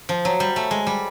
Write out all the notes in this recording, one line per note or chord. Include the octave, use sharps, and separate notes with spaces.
F3
F#3
G3
A3
G#3
G3